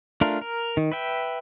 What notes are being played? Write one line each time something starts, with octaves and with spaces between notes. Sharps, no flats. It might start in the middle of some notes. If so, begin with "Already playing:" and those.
A3 D4 F4 A#4
A#4
D#3
B4 E5 G5